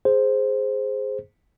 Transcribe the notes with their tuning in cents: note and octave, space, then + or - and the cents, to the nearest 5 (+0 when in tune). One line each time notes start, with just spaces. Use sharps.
G#4 +0 C5 +0